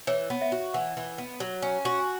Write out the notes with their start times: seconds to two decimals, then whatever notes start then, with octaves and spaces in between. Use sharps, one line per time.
0.07 E3 C#5
0.30 B3
0.42 E5
0.52 F#4
0.74 E3 F#5
0.97 E3
1.18 B3
1.40 F#3
1.62 C#4
1.85 F#4
1.99 G#5